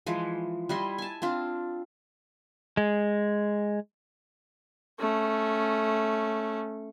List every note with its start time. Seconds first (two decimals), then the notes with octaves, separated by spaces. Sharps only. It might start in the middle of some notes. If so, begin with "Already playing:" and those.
0.06 E3 F3 G#3
0.69 G3 E4 D#5 C6
0.98 G#5 A5
1.22 C4 D4 F4
2.77 G#3
4.99 A3 C#4